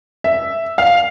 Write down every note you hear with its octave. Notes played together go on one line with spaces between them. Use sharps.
E5
F5